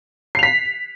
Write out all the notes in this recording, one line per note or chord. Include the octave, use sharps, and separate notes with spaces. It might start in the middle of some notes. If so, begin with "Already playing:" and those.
B6 C7 F7